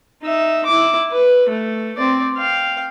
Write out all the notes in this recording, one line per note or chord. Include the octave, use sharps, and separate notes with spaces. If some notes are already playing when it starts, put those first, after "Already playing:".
D#4 E5
E4 D6
B4
A3
C4 D5
F5 G5